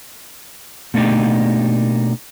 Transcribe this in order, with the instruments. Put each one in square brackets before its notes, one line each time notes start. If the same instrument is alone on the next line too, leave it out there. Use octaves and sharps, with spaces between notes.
[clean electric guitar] B2 A3 A#3 D4 D#4 G4